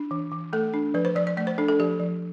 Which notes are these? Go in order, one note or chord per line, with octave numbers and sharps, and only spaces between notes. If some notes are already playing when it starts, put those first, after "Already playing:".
Already playing: D4
E3
E3
A3 A4
D4
F3 B4
C5
F3 D5
D5
A3 D5
C5
D4 A4
A4
F3 G4
F3